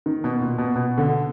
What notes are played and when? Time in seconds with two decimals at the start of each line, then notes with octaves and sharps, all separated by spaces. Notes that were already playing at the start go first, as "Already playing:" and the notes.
0.06 D#3
0.24 B2
0.41 A#2
0.58 B2
0.76 B2
0.98 D3